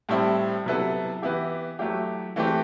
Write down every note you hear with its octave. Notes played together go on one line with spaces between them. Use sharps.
A2 G3 C4 E4
C3 F#3 B3 E4 A4
E3 B3 E4 G4
F#3 A3 E4 G4
E3 A3 C4 G4